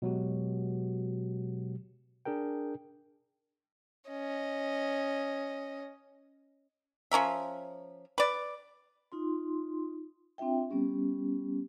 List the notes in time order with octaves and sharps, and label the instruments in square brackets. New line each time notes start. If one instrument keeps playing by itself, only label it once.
[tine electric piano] B2 F#3 G#3 F#4 G4
D4 G#4 A#4 G5
[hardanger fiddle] C#4 D#5
[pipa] F3 C#4 A#4 E5
B4 D5
[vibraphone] D#4 F4 C6
C4 D4 F4 E5 G5
G3 B3 C#4 G4